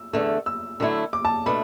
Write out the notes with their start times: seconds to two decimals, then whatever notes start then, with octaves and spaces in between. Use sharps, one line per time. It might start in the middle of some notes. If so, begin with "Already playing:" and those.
Already playing: E6
0.13 E2 D3 A3
0.46 E6
0.80 D3 F#3 A3 E4
1.13 D6
1.25 A5
1.46 B2 A3 D4 B5